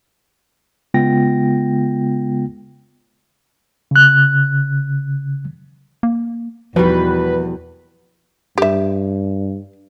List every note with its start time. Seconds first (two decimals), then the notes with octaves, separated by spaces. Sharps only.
0.94 C#3 G#3 B3 F4 G5 A#6
3.91 C#3 F#6
6.03 A#3
6.76 E2 B2 D#3 F3 G3 B4
8.58 G2 G4 E5